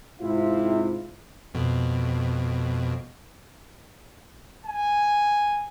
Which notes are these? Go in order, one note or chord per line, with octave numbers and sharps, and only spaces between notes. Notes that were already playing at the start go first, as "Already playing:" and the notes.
G#2 C3 E4 F4
F2 B2
G#5